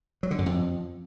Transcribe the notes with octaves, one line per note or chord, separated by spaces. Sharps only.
F#3
D3
F#2
F2